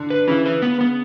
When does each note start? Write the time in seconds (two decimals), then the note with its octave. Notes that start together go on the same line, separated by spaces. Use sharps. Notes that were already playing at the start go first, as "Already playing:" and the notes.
Already playing: D3
0.10 B4
0.28 C#3 E4
0.46 B4
0.62 B3
0.81 B3